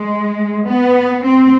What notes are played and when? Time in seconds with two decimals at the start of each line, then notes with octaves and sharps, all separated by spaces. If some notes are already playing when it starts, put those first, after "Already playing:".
Already playing: G#3
0.66 B3
1.24 C4